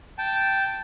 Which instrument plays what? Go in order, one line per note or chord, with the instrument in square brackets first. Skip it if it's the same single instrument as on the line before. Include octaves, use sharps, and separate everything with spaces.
[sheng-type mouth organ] G5 A5